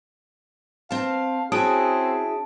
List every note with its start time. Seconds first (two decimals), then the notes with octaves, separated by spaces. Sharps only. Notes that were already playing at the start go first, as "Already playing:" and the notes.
0.91 C4 F5 A5
1.52 C4 C#4 E4 F#4 G#4 A5 D#6 D7